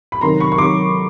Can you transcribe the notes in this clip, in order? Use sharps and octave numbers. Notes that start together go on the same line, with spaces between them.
B5
C3 D#3 F#3 A#5 C6
B5 C#6
C#6
C3 D#3 F#3 C6 D6